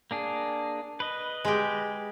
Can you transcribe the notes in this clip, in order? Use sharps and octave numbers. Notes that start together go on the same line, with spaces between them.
A#3 D4 G#4
B4 D#5
G#3 G4